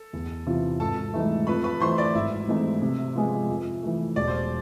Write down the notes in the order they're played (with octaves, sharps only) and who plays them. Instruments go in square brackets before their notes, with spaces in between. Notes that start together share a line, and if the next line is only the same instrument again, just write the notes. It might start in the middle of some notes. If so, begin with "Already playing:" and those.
Already playing: [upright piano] A4
[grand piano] E2
C3 E3 B3 F4
[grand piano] G#1 [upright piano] A4 A5
[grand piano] G#2 E3 A3
[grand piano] F2 [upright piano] B4 B5
[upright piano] B4 B5
[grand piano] E3 A3 [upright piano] C5 C6
[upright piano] D5 D6
[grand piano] G#1 [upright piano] E4 E5
[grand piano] G#2 E3 A3 C4
C3
F3 G#3 B3 F4
F2
E3 A3
[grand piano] E1 [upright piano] D5
[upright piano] C5